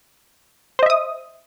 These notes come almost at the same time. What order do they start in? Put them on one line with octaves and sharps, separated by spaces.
C5 D#5 E5 D#6